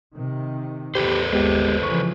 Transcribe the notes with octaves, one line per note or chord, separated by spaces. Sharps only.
C3 D#3
E2 G4 A4 B4 C5
G1 D#2 G#3 B3 G4
C#3 E3 F3 C#6